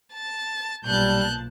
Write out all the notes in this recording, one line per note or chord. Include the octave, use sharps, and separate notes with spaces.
A5 A6
B1 A#2 G3 A5 F#6 G6